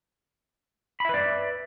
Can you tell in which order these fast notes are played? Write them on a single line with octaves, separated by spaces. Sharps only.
B5 E5 B4 D5